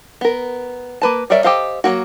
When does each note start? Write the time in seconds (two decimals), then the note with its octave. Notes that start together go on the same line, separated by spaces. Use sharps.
0.21 B3 A#4
1.02 A#3 B4 A5
1.30 G3 A#4 C#5 D5 E5
1.44 G4 A4 C5 D#5 F5
1.84 F#3 A#3 F#4